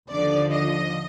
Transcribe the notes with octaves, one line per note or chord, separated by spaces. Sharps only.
D#2 D3 F3 D5
D#5